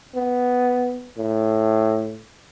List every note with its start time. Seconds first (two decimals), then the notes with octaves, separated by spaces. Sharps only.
0.15 B3
1.17 A2